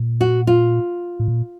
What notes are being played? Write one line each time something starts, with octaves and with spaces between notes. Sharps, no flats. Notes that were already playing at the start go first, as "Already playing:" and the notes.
Already playing: A#2
F#4
F4
A2
A#2